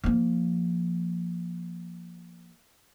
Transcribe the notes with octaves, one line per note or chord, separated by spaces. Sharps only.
F3 A#3